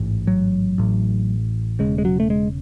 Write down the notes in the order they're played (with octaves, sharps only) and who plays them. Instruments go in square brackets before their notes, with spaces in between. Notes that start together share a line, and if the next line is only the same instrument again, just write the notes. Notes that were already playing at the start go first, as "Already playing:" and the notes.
Already playing: [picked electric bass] A1 G#2
F#3
A1 A2
E1 E2 C#3 G#3
G#3
F#3
A3
G#3